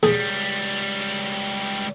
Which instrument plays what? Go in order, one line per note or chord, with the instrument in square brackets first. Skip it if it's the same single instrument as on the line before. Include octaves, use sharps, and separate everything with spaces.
[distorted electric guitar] C#2 G3 [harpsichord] G#4